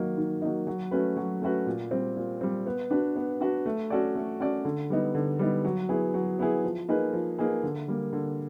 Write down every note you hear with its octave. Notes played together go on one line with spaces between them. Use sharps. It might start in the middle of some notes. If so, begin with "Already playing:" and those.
Already playing: D#3 F#3 A#3 D#4
D#3
F#3 A#3 D#4
F#3
A3 C#4 F#4 B4
F#3
A3 C#4 F#4 B4
A#2
G3 C4
A#2
G3 C4
B3
D4 F#4 B4
B3
D4 F#4 B4
A3
C#4 F#4 A4 D5
A3
C#4 F#4 A4 D5
D3
G3 B3 D#4
D3
G3 B3 D#4
F#3
B3 E4 G#4
F#3
B3 E4 G#4
F3
A#3 D#4 G#4 B4
F3
A#3 D#4 G#4 B4
D3
G3 A#3
D3